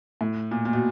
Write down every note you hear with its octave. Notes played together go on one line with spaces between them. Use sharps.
A2
A#2
A#2
B2